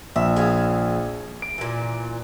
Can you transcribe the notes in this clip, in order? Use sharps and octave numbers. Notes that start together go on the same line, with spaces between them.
A#1 E5
G#4 E5 F5
D7
A#2 E3